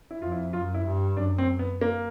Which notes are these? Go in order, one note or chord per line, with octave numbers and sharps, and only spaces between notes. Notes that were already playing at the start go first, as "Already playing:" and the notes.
E4
F2 F4
E4
F#2 F4
E4
G2
F#2 D4
C4
B3
A#3